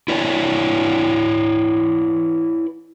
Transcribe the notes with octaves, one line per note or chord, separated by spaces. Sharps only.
E4 B4 C#5 D5